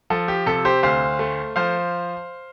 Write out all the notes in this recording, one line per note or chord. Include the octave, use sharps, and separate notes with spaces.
F3 A4
G4
C3 A4
G4 C5
D2 C5 F5
A3
F3 C5 F5